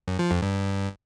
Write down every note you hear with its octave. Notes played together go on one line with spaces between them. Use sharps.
F#2
F3
F2
G2